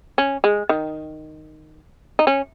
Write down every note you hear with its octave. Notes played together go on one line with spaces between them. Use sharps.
C#4
G#3
D#3
D#4
C#4